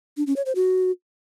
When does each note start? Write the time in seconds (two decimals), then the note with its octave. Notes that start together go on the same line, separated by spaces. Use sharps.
0.17 D4
0.27 C#4
0.36 C#5
0.46 C5
0.55 F#4